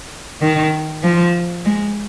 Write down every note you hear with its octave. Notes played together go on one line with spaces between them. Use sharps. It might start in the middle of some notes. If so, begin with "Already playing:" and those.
D#3
F3
G#3